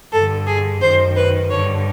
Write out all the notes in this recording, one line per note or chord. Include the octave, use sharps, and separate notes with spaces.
G2 D3 A4
G#4
F#2 D#3 C5
B4
G2 D3 C#5